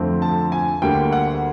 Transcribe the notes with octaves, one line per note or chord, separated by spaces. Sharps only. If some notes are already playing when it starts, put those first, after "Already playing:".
Already playing: F2 D3 F3 A3 C4
A5
G#5
D2 D3 G3 A#3 G5
F#5